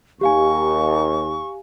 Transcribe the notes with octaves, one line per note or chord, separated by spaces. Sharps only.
D#2 G4 F5 G#5 C#6